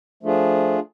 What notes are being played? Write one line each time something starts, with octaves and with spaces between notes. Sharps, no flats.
F3 A3 D4 F4 G#4